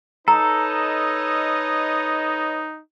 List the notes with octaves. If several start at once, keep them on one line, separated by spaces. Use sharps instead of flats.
D#4 A4 B4 C#5 D#5 A#5